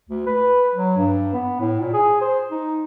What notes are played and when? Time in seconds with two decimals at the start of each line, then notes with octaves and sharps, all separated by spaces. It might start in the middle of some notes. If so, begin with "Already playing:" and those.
0.09 D2
0.27 B4
0.74 F#3
0.97 G2
1.33 B3
1.60 A2
1.80 A#2
1.94 G#4
2.21 C5
2.51 D#4